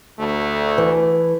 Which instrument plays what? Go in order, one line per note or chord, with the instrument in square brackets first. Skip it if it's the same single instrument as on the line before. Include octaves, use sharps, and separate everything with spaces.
[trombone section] D2 A3
[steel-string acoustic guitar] E3